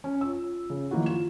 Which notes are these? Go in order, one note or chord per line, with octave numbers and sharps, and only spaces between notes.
C#4
F4 E6
C#3
D#3 F3 F#3 A#3 E4 F#4
F4 E7